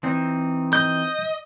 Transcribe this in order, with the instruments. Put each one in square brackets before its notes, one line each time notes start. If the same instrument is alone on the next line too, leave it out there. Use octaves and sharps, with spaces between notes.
[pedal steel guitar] E3 C4 D#4
[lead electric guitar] D#5 [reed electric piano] G6